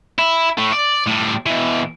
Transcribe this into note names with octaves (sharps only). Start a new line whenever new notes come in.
E4
A2 A3
D5
A2 G3
B2 E3